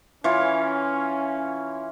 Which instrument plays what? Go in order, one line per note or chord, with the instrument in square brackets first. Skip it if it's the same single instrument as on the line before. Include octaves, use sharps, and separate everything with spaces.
[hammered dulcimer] E3 F4 C#5 [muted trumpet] C#4